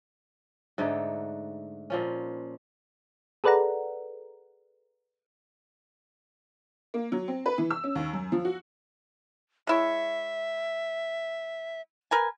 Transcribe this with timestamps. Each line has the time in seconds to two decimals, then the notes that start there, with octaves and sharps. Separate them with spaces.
0.78 G#2 D3 A3 D#4
1.90 A#2 F3 C#4
3.44 G#4 A4 B4 D5 F#5 A#5
6.94 A#3
7.12 F#3
7.28 C4
7.46 B4
7.58 E3
7.70 E6
7.84 C#4
7.95 D#2
8.13 F#2
8.32 F3
8.45 F#4
9.67 G#3 E4 C#5 E5
12.11 A#4 B4 G#5